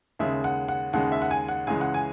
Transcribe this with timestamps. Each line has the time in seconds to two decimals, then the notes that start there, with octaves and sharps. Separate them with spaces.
0.19 D#2 C#3 G#3 E5
0.44 F#5
0.68 F#5
0.93 D#2 C#3 G#3 F#5
1.12 E5
1.22 F#5
1.31 G#5
1.48 F#5
1.67 C#2 C#3 E3 G#3 G#5
1.81 F#5
1.94 G#5